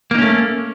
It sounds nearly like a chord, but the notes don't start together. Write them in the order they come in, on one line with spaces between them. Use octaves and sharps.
A#3 D#4 C#4 A3